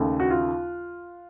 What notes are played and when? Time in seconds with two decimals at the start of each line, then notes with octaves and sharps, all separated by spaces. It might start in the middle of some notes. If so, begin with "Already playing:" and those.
Already playing: D#2 C#3 A3
0.20 F#4
0.31 F4